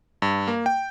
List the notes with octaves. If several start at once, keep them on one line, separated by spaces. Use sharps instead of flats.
G2
A#3
G5